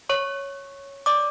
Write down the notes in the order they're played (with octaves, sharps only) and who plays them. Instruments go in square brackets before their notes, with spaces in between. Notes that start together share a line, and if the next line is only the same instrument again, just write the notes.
[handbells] C#5 C#6
D5 D6